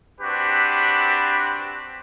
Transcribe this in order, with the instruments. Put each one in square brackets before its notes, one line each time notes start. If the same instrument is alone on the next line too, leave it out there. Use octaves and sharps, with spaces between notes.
[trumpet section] C4 D4 F#4 G4 B4